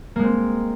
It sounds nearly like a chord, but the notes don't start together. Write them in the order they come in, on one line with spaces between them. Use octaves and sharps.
A#3 G#3 C4